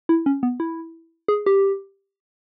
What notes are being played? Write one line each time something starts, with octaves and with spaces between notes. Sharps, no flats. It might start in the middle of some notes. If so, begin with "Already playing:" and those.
E4
C#4
B3
E4
G#4
G4